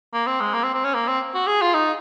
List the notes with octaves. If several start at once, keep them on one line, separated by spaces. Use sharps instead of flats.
A#3
C4
G#3
A#3
C4
C4
C#4
A#3
C4
F#4
G#4
F4
D#4